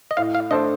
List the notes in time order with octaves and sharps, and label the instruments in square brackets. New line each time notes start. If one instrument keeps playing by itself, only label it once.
[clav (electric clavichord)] D#5
[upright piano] A2 [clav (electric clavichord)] F5
[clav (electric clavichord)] F5
[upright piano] A3 D4 A4 C5 [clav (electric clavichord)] D#5